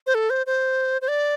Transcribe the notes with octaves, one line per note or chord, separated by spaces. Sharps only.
C5
A4
C5
C5
C5
D5